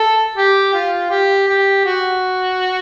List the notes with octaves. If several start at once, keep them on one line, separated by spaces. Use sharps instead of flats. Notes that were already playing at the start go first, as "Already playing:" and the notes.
Already playing: A4
G4
F4
G4
G4
F#4